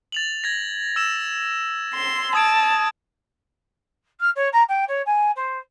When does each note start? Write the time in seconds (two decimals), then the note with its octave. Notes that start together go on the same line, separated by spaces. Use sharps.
0.12 A6 F7 F#7
0.44 G#6 A#6
0.96 E6 E7
1.93 C6
2.35 A5 D#6 G#6 D7
4.20 F6
4.36 C#5
4.53 A#5
4.69 G5
4.88 C#5
5.06 G#5
5.36 C5